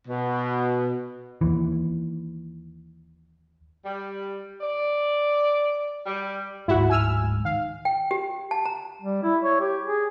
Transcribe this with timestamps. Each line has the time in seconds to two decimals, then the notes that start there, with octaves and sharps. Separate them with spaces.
0.08 B2
1.41 D#2 E3
3.85 G3
4.61 D5
6.06 G3
6.68 D1 G1 G#2 E4 F#4
6.90 G#5 E6 F6
7.45 D#3 F5
7.85 G5
8.11 G4
8.51 A5
8.65 A#5
9.02 G3
9.23 E4
9.42 C#5
9.60 G4
9.85 G#4